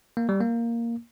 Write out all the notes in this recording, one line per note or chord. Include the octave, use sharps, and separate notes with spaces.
A#3
G3
A#3